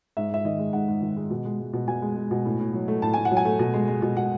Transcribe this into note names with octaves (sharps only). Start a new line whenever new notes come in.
G#2 E5
G#2 E5
D#3 D#5
G#3
G#2 F#5
G#2
D#3
G#3
B2
G#3
G#3
B2
B2 G#5
G#3
G#3
B2
A2
A2
F#3
A3
A2 A5
A2 G#5
F#5
F#3
G#5
A3
B2
G#3
G#3
B2
B2 F#5